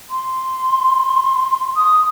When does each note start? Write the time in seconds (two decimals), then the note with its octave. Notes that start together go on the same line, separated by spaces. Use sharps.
0.10 C6
1.76 D#6